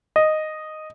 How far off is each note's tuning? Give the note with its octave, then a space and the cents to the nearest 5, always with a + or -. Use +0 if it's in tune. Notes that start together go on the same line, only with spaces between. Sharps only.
D#5 -5